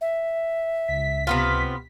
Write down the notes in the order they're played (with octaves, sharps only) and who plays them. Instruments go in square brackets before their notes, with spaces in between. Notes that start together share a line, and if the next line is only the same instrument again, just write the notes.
[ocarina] E5
[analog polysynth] C#2 B6
[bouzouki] C3 B3 F4